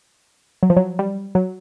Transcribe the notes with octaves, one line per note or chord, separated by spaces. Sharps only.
F#3
F3
F#3
G3
F#3